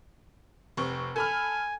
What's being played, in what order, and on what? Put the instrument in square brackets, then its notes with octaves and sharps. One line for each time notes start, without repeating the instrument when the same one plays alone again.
[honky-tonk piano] F1 C4 C#6
[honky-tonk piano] A4 B5 F6 [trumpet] G#5